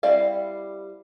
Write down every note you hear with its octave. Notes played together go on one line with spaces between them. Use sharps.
G3 C4 E4 D5 F5